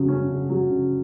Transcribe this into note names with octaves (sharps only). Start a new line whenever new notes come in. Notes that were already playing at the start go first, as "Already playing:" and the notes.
Already playing: C#3 F#3
C#4
C#3
F#3
C#3